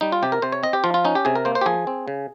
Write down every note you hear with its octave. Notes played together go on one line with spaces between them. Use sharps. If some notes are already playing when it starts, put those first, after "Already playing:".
G3 D#4
F4
C3 G4
A#4
C3 C5
C#5
C4 D#5
G4
F3 F4
F4
C#4 D#4
G4
C3 G#4
A#4
A#3 C5
C5
G4
F3 G#4
C4
C#3